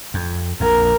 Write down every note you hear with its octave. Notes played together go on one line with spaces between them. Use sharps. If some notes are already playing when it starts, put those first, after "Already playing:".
F2
A#1 F2 A#4